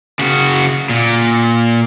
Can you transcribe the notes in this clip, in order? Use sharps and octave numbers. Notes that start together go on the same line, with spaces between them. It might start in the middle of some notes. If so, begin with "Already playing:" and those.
C#3 F#4
A#2